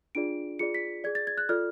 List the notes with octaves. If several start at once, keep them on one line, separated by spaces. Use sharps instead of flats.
D4 F4 G#4 D5 D7
F4 G#4 D5 C#7
B6
G#4 D5 G#6
A6
G#6
F#6
F4 A4 D5 F6